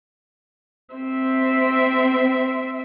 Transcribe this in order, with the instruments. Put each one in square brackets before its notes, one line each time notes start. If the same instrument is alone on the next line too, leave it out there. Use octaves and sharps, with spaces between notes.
[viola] C4 E5